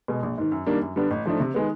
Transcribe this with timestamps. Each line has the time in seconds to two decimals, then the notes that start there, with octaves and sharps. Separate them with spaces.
0.08 B2 G#3
0.23 A#1
0.38 G#2 D#3
0.52 F#2
0.67 D#3 G3 A#3 D4
0.81 F#2
0.96 D3 G3 B3 D4
1.11 A1
1.26 G#2 F3 A3 D4
1.40 C3
1.54 D#3 G#3 B3